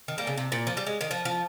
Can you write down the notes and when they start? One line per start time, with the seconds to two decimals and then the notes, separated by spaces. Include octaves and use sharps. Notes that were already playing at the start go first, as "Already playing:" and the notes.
0.08 D#3
0.18 G3 A#3
0.27 C#3
0.38 C3
0.52 A#2
0.67 F3
0.77 G3
0.87 G#3
1.01 D#3
1.11 F3
1.25 F3